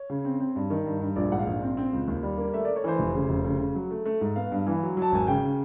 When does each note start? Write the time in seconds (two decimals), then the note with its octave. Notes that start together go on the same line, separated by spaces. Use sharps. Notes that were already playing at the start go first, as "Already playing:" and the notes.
Already playing: C#5
0.10 C#3
0.25 C4
0.40 C4
0.56 G2
0.70 D#3
0.86 G2
1.01 G2
1.16 A#1 D5
1.31 G#2 F#5
1.39 F5
1.47 A#1
1.62 C4
1.77 C4
1.93 C#2
2.08 D#2
2.23 G3
2.38 A#3
2.53 A3 E5
2.65 D5
2.69 A3
2.76 C#5
2.84 E3 C5
2.99 F1
3.14 C#3
3.29 F1
3.44 C#3
3.60 C#3
3.75 F#3
3.91 A3
4.06 A3
4.21 G#2
4.36 B3 F5
4.51 G2
4.67 E3
4.82 F#3
4.97 F#3 A5
5.12 G#1 G#5
5.27 C#3 G5
5.43 C#3